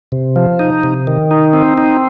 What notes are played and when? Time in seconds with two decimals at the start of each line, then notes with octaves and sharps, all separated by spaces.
0.12 C3
0.36 F3
0.59 D#4
0.83 C3
1.07 D#3
1.31 D#4
1.53 C4
1.78 D#4